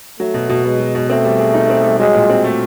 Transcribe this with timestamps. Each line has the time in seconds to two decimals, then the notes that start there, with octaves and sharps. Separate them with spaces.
0.20 F#3 A3
0.34 B2
0.49 B2
0.65 G#3 B3
0.80 F#3
0.95 B2
1.09 A3 C4
1.25 G3
1.39 G#4
1.54 D#4
1.70 C4
1.84 G3
1.99 F#3 G#3
2.14 A#2
2.30 C4
2.44 A3